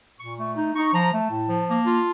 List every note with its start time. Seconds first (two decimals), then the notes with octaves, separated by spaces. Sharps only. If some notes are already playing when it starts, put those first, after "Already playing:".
0.20 A#2 C#6
0.38 A3 C#6
0.56 D#4
0.75 D#4 C#6
0.94 F3 A#5
1.12 A3 A5
1.31 A2
1.49 F3
1.68 A#3
1.86 F4